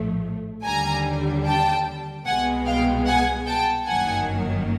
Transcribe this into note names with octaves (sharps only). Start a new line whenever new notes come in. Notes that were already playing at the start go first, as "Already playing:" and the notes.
Already playing: A#1 A2 F3 A3
D#2 D3 G3 G#5 A#5
G5 A5
C2 B2 G#3 B3 F#5 G#5
F5 G5
F#5 G#5
G5 A5
G1 F#2 D#3 F#3 A#3 F#5 G#5